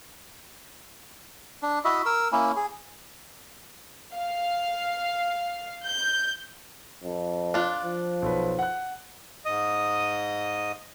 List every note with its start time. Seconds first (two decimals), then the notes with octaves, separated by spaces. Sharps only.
1.63 D4
1.85 E4 F#4 D#5 E5
2.06 A#4 E6
2.32 A#3 C#4 E4
2.56 G#4
4.14 F5
5.85 G6
7.04 F2
7.54 D4 F4 F#6
7.85 F3
8.22 B1 B4
8.59 F#5 F#6
9.45 G#2 D#5 D#6